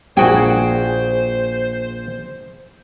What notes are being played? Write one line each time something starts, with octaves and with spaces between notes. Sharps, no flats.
A#1 F#4 G#4 C5 G5 G#5